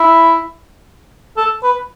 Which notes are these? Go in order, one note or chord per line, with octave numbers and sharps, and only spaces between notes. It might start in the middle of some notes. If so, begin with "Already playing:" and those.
Already playing: E4
A4
B4